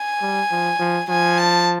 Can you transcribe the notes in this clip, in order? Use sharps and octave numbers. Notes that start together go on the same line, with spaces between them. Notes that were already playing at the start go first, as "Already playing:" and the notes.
Already playing: G#5
G3
F3
F3
F3 G#5
A5